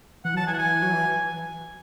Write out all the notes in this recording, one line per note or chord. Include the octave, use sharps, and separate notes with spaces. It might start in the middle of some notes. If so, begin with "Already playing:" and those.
E3 F#5
F#3 A5
E3 G#5
F#5
G#5
F#3
E3